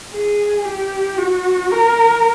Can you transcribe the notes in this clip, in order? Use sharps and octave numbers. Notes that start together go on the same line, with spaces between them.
G#4
G4
F#4
A#4